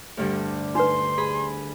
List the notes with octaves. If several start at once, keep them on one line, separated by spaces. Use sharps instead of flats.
D2 G2 D3
D#4 B4 C6
G#4 B5